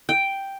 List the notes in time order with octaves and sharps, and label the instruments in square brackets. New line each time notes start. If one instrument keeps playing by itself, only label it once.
[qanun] G5